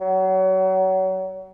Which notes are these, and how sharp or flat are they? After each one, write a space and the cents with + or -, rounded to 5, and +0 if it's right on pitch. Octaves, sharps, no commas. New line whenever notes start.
F#3 +30